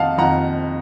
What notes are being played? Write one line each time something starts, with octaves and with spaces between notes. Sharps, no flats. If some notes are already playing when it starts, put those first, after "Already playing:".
Already playing: F2 D#3 D#5 F5 F#5 A5
F2 D#3 F#5 A#5